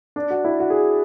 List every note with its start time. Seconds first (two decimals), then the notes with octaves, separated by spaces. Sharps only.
0.16 D4
0.30 F#4
0.45 E4
0.60 F#4
0.70 G#4